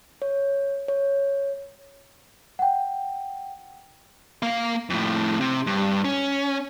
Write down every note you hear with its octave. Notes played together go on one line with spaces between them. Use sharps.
C#5
C#5
F#5 G5
A#3 F5
F2 A2
C3
G2
C#4